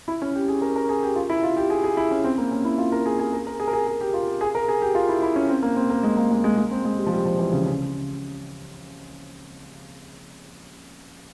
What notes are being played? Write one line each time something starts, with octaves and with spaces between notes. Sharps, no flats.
E4
C#4
G4
G#4
A#4
A#4
G#4
G4
F4
E4
F4
G4
G#4
G#4
E4
C#4
C4
A#3
C#4
E4
F4
A#4
G#4
G#4
A#4
A#4
G#4
A#4
G#4
G#4
G4
F4
G#4
A#4
G#4
G4
F4
E4
E4
C#4
C4
A#3
C4
A#3
G#3
A#3
G#3
G#3
G#3
C4
G#3
G3
F3
G3
F3
E3
C#3
C#3